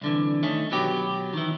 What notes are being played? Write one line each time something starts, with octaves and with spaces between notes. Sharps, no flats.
C2 D3 E3
D#3 A3 C#4
B2 F#3 B3 G4
D#3 E3